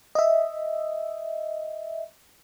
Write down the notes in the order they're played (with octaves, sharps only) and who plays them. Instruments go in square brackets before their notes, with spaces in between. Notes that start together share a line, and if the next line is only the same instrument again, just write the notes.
[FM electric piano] D#5 E5